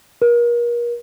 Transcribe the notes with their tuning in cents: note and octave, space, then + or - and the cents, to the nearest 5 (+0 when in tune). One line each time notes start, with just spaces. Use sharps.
A#4 +35